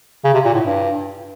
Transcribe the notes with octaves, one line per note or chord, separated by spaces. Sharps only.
C#3
C3
A#2
A2
G2